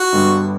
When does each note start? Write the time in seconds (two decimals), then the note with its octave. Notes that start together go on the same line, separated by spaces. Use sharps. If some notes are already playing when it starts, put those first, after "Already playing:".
Already playing: F#4
0.12 G1 G2 D3 G3 B3